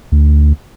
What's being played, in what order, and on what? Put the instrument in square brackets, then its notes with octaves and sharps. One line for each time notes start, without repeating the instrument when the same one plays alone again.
[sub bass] D2